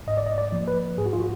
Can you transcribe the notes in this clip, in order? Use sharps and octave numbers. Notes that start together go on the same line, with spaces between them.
G#2 D#5
D5
D#5
D5
F3 A#3
B4
G#2 G#4
F#4
F4
F#4